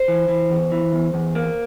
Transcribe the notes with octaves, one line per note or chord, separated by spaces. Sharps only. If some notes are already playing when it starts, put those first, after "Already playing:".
Already playing: C5
E3
E3
E2
E3
E2
E2
A#3